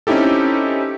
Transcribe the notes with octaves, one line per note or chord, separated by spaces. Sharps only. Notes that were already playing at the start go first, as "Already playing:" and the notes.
C4 C#4 D#4 E4 G4 A4